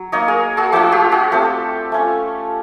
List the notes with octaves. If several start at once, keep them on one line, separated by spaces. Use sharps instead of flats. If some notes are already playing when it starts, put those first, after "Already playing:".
Already playing: F#3
A#3 D#4 C#5 D#5
G#4 A#4
F#4 G#4
F3 A3 D4 F4 F#4 G#4
F4 G4
F#4 G#4
A3 C4 F4 G4 A4
A3 C#4 F4